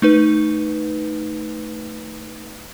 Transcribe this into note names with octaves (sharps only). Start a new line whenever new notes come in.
A3 D#4 B4